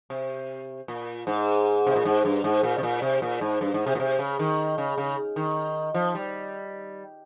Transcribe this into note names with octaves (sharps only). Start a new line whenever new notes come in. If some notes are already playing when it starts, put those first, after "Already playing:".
C3
A#2
G#2
C3
A#2
G#2
G2
G#2
A#2
C3
A#2
C3
A#2
G#2
G2
G#2
C3
A#2
C3
C#3
D#3
C#3
C#3
D#3
F3
G3